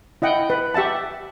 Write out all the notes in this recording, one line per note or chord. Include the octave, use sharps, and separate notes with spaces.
E4 D#5 F#5 G5
B4
G4 E5 F#5 A5